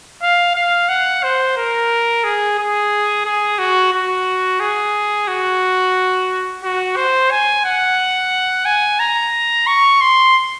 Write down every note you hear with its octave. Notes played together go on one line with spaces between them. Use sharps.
F5
F5
F#5
C5
A#4
G#4
G#4
G#4
F#4
F#4
G#4
F#4
F#4
C5
G#5
F#5
G#5
A#5
C#6
C6